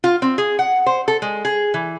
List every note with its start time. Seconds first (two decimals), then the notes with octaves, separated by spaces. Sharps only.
0.04 F4
0.22 C4
0.38 G#4
0.59 F#5
0.86 C5
1.08 A4
1.22 G#3
1.45 G#4
1.74 E3